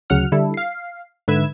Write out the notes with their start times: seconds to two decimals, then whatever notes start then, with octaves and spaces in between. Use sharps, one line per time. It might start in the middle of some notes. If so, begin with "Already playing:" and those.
0.10 D2 C#3 F#3 F#5 F6
0.32 D3 G3 E4 A4
0.54 F5 C7
1.28 G#2 D3 B4 E5 G#6 E7